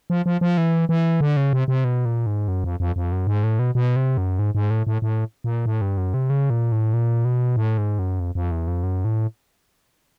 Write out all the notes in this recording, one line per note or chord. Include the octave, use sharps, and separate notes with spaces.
F3
F3
F3
E3
E3
D3
C#3
C3
C3
B2
A#2
G#2
F#2
F2
F2
F2
F#2
G#2
A2
B2
B2
C3
F#2
G#2
G#2
A2
A2
A2
A#2
A2
G2
F#2
C3
C#3
A#2
A2
A#2
B2
A2
G#2
F#2
F2
F2
E2
F2
F#2
A2